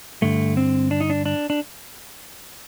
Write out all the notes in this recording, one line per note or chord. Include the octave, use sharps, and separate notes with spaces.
G2 D3 A3
C4
D4
D#4
D4
D4
D4